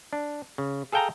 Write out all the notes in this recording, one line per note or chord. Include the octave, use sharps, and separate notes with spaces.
D4
C#3
G#4 A4 F5 G5 A5 A#5